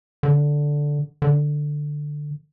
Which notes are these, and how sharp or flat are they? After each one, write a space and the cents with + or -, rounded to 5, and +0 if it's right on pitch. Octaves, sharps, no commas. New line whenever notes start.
D3 -5
D3 +10